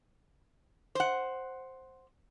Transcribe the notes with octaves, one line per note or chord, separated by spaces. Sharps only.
C5 F#5